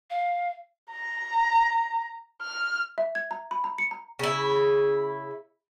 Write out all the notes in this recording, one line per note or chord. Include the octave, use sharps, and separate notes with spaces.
F5
A#5
F6
E5
G#6
A#5
B5
A#5
C#7
A#5
C#3 E4